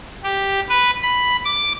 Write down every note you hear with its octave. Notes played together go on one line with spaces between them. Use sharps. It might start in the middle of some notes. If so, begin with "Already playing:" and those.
G4
B4
B5
D6